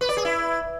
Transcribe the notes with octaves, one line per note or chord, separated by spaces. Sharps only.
B4
D5
G#4
E4